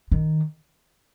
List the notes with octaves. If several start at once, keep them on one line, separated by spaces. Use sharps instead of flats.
D#3